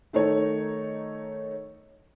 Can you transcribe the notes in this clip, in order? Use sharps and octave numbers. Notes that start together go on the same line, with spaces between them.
D#3 A3 D#4 A4 C#5